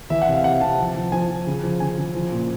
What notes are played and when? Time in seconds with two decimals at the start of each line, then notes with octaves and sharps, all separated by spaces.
0.10 E3 E5
0.22 F#5
0.27 C3 F5
0.44 C3 F#5
0.61 C3 A5
0.78 F3
0.96 F3
1.12 F3 G#5
1.29 F3
1.47 C#3
1.63 F3
1.80 C#3 G#5
1.98 C#3
2.14 F3
2.32 A#2